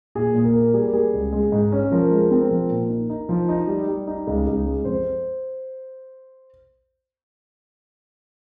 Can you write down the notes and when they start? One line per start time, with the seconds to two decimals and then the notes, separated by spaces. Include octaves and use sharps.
0.15 A#2 G#4
0.34 A#2
0.44 A#4
0.55 A#3
0.73 G3 G#4
0.83 A#4
0.93 G3 G#4
1.13 C#2
1.33 G#3
1.52 G#2
1.72 C#4
1.92 F3 A#4
2.11 G#3
2.22 A#4
2.31 C4
2.50 F3 A#4
2.70 A#2
2.89 D#4
3.10 D#4
3.29 F3
3.49 D#4
3.67 G3
3.87 G3
4.07 D#4
4.27 C#2
4.47 C#2
4.66 G#3
4.85 F2 C5